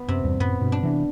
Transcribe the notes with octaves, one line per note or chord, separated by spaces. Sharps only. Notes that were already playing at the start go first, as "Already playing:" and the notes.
Already playing: B3
F#2 C3
E2 G2
F#2 A2 B3
G2 B2
D4
C3 E3